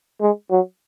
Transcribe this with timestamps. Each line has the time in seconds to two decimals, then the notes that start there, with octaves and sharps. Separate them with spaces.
0.21 G#3
0.51 F#3